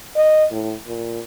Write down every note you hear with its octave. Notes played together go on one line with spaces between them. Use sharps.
D#5
A2
A#2